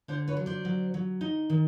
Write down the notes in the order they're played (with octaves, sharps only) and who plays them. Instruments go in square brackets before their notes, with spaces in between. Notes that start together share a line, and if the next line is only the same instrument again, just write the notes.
[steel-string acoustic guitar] D3 C5 D5
B4 C#5
F#3
C5 D5
F#3
F#3
D#4
D#3